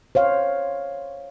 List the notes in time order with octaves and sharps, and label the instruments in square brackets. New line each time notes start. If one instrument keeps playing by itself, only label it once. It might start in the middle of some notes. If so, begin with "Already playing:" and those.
[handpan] C5 C#5 F5